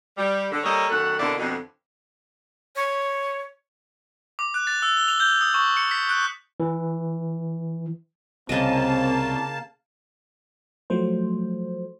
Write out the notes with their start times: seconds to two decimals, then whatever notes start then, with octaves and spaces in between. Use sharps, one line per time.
0.17 G3
0.52 D3
0.64 G3 A#3 A4 A#4 C#5 D#5
0.90 F#2 D#3 A3 F#4 A4 F#5
1.19 B2 D3 A#3 C4 E4 D5
1.38 F2 B2 D3
2.76 C#5
4.39 D6
4.54 F#6
4.67 A6
4.82 E6
4.97 G7
5.08 F7
5.20 G6
5.41 D#6
5.54 C#6
5.77 C#7
5.91 B6
6.09 F#6
6.60 E3
8.49 C2 C#3 A#3 C4 D#5 A5
10.90 F3 F#3 A3 C5